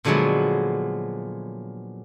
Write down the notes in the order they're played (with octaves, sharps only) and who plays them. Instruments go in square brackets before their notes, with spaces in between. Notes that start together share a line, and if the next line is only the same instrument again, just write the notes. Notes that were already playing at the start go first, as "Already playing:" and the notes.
[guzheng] A#2 D3 F3 F#3 G#3 B3